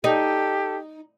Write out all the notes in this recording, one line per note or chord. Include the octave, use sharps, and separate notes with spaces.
D#4 G4 A4